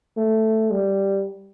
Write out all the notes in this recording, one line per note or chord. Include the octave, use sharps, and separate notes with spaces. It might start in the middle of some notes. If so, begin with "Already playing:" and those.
A3
G3